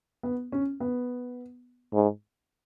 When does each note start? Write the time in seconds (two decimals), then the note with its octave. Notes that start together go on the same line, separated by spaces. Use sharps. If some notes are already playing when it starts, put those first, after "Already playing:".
0.23 B3
0.52 C#4
0.80 B3
1.94 G#2